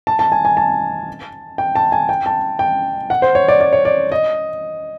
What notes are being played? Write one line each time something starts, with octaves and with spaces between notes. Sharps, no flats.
A5
A5
G#5
G#5
A5
G5
A5
G#5
G5
A5
G5
F#5
C5
C#5
D5
D5
C#5
D5
D#5